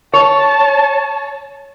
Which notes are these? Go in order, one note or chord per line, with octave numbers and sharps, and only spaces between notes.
C#5 A5